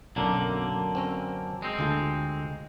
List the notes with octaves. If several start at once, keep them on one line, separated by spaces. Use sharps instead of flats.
B1 F#2 D3 A#3
C4 C#4 A#4
G#3 C4
D2 F4 A4